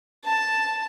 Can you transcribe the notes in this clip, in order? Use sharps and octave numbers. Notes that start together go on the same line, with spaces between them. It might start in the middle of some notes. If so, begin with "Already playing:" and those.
A5